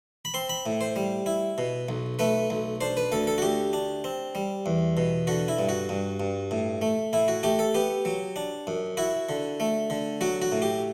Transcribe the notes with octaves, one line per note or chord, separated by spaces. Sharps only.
B5
C4 C6
B5
A2
C5
G3
E4
B2
B1
A3 B4
B1
D4 C5
B4
D2 A4
A4
F#4
D2 G4
D4
C4
G3
E2
B2
D3 F#4
E4
G2
F#4
G2
G2
A2
A3
A2 E4
F#4
A3 G4
A4
B3 G4
F#3
D4
F#2
E4 F#4
D3
A3
D3
F#3 F#4
F#4
A2
G4